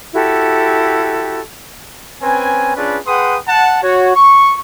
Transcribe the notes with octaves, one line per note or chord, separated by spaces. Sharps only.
E4 F#4 G4 A4
C4 C#4 B4 G#5
C#4 D4 F4 G#4 B4
G#4 B4 F#5 G5 C6 D#6
F#5 A5
F#4 C#5
C#6